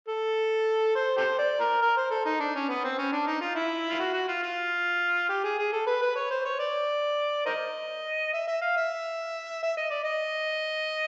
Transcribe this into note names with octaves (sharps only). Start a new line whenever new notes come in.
A4
C5
G4 A4 C5
D5
A#4
A#4
C5
A4
D#4
D4
C#4
B3
C4
C#4
D4
D#4
F4
E4
F4
F#4
F#4
F4
F4
G4
G#4
G#4
A4
B4
B4
C#5
C5
C#5
D5
A#4 C5 D#5
E5
E5
F5
E5
E5
D#5
D5
D#5